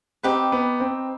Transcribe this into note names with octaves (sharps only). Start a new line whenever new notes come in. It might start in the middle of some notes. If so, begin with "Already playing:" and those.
C4 D#4 G4 B4
B3
C4